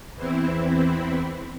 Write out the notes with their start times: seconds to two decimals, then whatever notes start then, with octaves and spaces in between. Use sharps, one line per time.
0.16 E2 E3 C4 E4